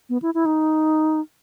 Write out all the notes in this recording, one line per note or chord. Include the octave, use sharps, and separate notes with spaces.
B3
E4
E4
D#4